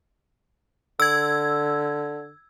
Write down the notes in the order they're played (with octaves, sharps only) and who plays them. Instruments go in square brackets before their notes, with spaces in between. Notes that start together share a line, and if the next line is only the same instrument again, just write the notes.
[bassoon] D3 [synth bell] E6 G#6